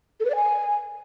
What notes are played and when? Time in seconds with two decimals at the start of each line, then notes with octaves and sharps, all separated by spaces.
0.20 A4
0.25 B4
0.30 D5
0.35 G#5